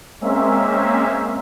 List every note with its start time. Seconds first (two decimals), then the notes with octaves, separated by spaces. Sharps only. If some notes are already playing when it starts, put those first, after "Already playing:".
0.21 G#3 A#3 C4 C#4 E5 F5